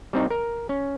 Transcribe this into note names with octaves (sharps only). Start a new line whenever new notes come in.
G3 C4 D#4
A#4
C#4